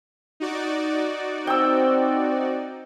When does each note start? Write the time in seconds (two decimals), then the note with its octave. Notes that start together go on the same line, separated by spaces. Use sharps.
0.40 D#4 F#4 D5
1.47 C4 G5 E6